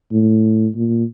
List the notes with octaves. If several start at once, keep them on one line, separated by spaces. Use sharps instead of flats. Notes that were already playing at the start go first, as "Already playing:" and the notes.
A2
A#2